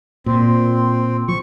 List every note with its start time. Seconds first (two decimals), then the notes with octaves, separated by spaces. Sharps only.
0.26 A#2 C4
1.28 F3 C#6